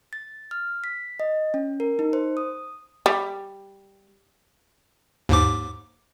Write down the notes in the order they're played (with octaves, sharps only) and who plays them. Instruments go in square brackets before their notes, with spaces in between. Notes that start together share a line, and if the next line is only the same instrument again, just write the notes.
[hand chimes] A6
F6
B6
D#5
C#4
A#4
D#4
C5
D#6
[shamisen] G3
[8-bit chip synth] D#2 G#2 D6